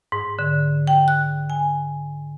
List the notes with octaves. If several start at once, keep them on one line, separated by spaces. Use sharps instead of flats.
G#2
D3
G5
F#6
G#5